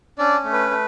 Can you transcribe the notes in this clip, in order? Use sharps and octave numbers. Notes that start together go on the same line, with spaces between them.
C#4 D4 D5
A3
B4
A3